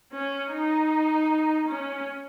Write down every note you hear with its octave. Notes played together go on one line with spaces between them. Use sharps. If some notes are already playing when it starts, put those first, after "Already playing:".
C#4
D#4
C#4